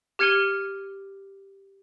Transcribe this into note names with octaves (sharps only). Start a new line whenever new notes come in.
G4 F6 G#6 C#7 D#7 G7